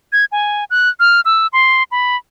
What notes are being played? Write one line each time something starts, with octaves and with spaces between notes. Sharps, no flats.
G#6
G#5
F#6
F6
E6
C6
B5